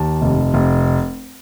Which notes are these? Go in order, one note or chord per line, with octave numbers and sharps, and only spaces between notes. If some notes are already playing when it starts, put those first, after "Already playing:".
Already playing: D#2 A5
F1
F1